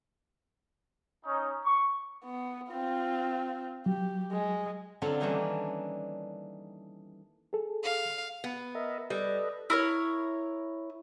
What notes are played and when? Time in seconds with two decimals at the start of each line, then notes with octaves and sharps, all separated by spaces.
1.24 C#4 D#4
1.65 C#6
2.24 B3
2.72 C4 F4
3.86 F#3 G4
4.32 G#3
5.02 D3 F#3 C4 D4 F4 A4
5.20 D#3 E3 G3 A#3 C#4 D4
7.53 G#4 A4
7.83 F5
8.44 B3
8.75 A#4 D#5 E5
9.10 G3 A4 B4 D#5
9.70 E4 A#4 C#5